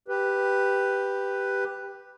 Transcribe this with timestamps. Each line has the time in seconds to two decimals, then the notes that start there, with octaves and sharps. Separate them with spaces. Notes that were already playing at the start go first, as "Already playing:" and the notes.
0.08 G4 B4